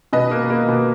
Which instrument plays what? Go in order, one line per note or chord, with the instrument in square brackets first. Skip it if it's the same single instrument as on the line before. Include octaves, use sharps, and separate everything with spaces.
[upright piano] B2 B4 D#5
A#3
A#3
B2